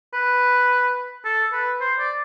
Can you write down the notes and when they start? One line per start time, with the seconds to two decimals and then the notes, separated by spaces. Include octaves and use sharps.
0.13 B4
1.25 A4
1.52 B4
1.81 C5
1.99 D5